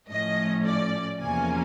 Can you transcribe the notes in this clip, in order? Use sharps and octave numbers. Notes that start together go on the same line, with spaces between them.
A2 F3 A3 C#4 D#5
D5
E2 C3 F3 A#3 C#4 G#5